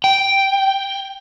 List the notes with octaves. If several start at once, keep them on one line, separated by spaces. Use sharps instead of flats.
G5